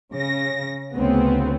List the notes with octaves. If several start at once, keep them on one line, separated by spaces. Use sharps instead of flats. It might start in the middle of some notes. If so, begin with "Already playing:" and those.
C#3 A#6
D2 C#3 B3 C4